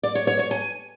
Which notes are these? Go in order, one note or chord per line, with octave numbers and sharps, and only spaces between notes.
D5
C#5
C#5
C#5
G#5